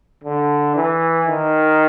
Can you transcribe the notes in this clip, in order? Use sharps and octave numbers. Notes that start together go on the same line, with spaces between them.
D3
E3
D#3